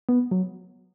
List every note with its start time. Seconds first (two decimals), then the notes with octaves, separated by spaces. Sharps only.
0.09 B3
0.31 F#3